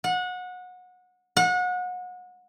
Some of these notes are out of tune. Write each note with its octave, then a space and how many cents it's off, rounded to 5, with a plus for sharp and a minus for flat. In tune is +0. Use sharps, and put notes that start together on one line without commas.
F#5 -25
F#5 -30